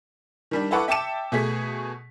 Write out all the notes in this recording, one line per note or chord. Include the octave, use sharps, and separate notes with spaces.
D#3 G3 D4
E4 A4 B4 F#5 C#6 D6
E5 G5 A5 D6 C#7 E7
B2 A3 G#4 B6